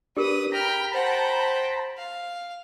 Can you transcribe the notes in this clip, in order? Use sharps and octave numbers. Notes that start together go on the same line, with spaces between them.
D4 G4 G#4 A#4 B4 D#6
G5 A#5 B5 F6
C5 F#5 G5 A5
F5